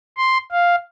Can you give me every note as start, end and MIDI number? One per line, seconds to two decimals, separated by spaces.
0.17 0.38 84
0.51 0.75 77